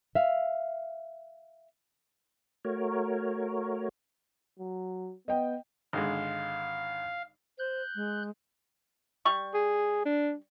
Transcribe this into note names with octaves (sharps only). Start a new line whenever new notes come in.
E5 F5
A3 F#4 A#4 C#5
F#3
B3 D#5 G5
G#1 D3 G#3 F5
C5 F#6 G6
G#3
G3 C#6
G#4
D4